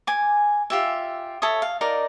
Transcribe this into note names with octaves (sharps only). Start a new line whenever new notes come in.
G#5 D6
F4 G4 E5
A4 C#5 E5 D#6
F5
D#4 A#4 D5